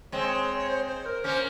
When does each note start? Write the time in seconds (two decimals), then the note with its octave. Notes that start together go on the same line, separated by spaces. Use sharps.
0.12 G#3 C4 C#5
0.58 C#5
0.69 C5
0.87 C5
1.06 A#4
1.24 A#3 C#4 C5